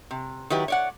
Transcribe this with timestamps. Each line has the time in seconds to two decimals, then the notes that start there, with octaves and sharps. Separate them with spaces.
0.11 C3
0.50 D#3 F#3 E4 G4 B4
0.68 C#5 D5 F#5